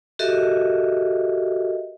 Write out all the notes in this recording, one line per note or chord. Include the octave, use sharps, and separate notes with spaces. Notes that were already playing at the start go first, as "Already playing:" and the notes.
F#4 G4 A4 A#4 D#5 E5